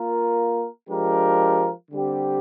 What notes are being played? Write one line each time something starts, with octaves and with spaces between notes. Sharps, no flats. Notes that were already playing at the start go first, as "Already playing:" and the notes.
Already playing: A#3 F4 A#4
F3 G#3 D4 G4 A#4
D3 G3 C4 G4